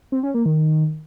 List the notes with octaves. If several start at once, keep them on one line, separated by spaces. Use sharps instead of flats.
C4
C#4
A#3
D#3